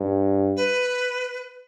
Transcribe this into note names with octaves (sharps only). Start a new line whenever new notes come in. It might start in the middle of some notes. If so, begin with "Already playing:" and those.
Already playing: G2
B4